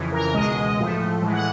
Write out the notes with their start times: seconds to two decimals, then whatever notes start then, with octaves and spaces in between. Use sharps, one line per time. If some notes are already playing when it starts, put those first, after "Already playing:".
Already playing: F2 C#3 E3
0.12 A#4
0.34 C#2 B2 G#3 D#5
0.78 A2 F3 A3
1.22 A2 E3 G#3
1.33 F#5